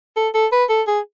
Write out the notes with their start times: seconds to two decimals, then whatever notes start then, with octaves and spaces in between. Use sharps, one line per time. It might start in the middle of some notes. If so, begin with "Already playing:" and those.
0.16 A4
0.34 A4
0.52 B4
0.70 A4
0.87 G#4